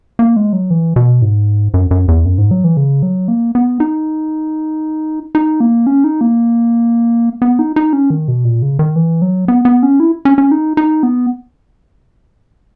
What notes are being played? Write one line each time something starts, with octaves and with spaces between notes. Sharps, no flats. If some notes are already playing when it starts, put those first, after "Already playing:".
A#3
G#3
F#3
E3
B2
G#2
F#2
F#2
E2
F#2
G#2
F#3
E3
C#3
F#3
A#3
B3
D#4
D#4
A#3
C#4
D#4
A#3
B3
D#4
D#4
C#4
D#3
B2
A#2
C#3
D#3
E3
F#3
B3
B3
C#4
E4
C#4
C#4
D#4
D#4
B3